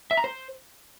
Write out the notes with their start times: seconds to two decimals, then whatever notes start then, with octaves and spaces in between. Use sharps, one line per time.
0.11 E5
0.17 A#5
0.24 C5